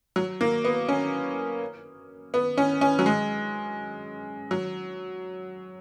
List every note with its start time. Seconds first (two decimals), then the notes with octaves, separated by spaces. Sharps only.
0.16 F#3
0.41 A#3
0.64 B3
0.88 C#4
2.34 B3
2.58 C#4
2.81 C#4
2.99 F#3
3.06 G#3
4.51 F#3